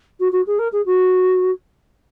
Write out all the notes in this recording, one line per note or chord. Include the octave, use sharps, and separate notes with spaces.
F#4
F#4
G#4
A#4
G#4
F#4